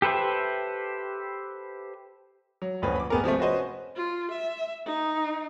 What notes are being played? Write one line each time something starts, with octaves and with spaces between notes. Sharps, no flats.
G4 A4 B4 C5 E5
F#3
F#1 D2 F3 C#4 B4 B5
B5 D6
F1 B3 G#4 A#4
C3 F3 G#3 A3
C#4 F#4 B4 C5 D#5
F4
E5
D#4